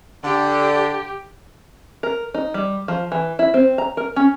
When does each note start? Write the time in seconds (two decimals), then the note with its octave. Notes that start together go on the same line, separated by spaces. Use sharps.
0.24 D3 G4
2.03 A#4
2.34 D#4
2.54 G3
2.88 F3
3.12 E3
3.39 E4
3.54 C4
3.78 A#5
3.97 A#4
4.16 C#4